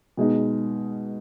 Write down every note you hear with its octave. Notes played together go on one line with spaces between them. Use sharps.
B2 G#3 D#4